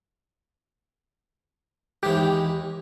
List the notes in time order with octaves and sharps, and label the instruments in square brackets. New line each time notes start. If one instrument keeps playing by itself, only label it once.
[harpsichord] D#2 E3 G#3 [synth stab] G4